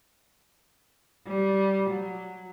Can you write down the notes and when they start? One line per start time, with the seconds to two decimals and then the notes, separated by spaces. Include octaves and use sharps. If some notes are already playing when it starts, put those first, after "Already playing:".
1.27 G3
1.90 F#3